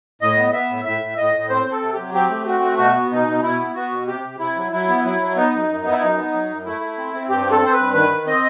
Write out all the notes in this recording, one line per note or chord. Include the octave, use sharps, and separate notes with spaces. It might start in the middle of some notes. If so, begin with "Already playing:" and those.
A2 D#5
B3
B3 E5
A2
A2 E5
A2
A2 D#5
A2
C4 C5
C4
A4
C3
F#3 G4
C4 G4
A3
C4 F#4
A3
B2 F#4
B3
B2 D#4
B2
B2 E4
B3
B3 F#4
B2
C3 G4
C3
C3 E4
F#3
F#3 E4
B3
F#3 E4
F#3
B3 D#4
F#2
F#2
B3
E4
F#2 D#4
B3
F#3
F#2
A3 E4
A3
C4
C4
G2 G4
C4
A4
C4 C5
B4
G2
D#3 B4
D#3
C4 D#5